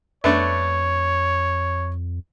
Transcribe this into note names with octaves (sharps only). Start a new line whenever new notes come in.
F2 A3 B3 D4 C#5